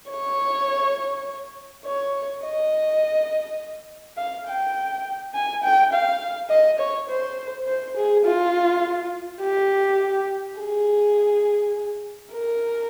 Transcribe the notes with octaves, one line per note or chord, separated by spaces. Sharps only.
C#5
C#5
D#5
F5
G5
G#5
G5
F5
D#5
C#5
C5
C5
G#4
F4
G4
G#4
A#4